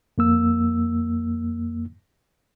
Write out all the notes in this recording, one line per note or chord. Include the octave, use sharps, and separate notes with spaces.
F2 A#3 E6